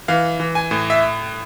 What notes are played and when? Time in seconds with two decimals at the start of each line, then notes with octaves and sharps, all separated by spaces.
0.08 E3 F5
0.40 E3
0.55 G#5
0.71 A2
0.90 E5